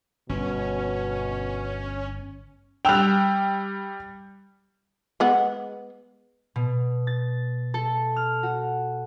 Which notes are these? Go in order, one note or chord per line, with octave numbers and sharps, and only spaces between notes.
G1 B2 C#4
G3 G5 E6 F#6 F7
G#3 B3 F#5
B2
A6
A4
F6
F#4